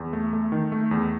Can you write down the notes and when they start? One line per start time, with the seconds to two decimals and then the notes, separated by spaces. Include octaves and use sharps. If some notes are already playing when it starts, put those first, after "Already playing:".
Already playing: E2
0.13 A3
0.33 A3
0.52 D#3
0.72 A3
0.91 E2